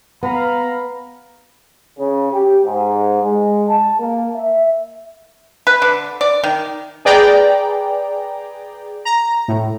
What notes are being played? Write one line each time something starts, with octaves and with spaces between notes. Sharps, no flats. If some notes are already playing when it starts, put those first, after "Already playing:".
B3 F5 A#5 B5
C#3
G4
G#2
G#3
A5
A#3
E5
B4
D3
D5
D#3
G#4 B4 D5 G5 A#5
A#5
A2